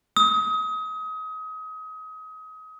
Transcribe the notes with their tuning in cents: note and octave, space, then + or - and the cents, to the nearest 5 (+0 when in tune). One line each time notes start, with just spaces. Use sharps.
D#6 +30